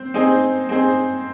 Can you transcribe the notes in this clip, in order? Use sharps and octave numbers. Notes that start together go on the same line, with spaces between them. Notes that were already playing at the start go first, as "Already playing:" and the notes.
Already playing: C4 C5
C4 D#4 G#4 C5
C4 D#4 G#4 C5